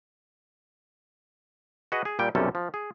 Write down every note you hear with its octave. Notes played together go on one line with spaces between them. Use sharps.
F#4 G#4 B4 D#5 F#5
G#4
A#2 G3 G5
B1 F#2 C3 G3 C#4 A4
F3
G#4